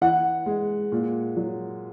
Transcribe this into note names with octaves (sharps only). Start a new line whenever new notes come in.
E3 F#5
G#3
A#2
F#3